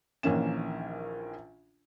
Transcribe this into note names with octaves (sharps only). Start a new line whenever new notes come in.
A#1 D#3 E3 A#3 C#4 E7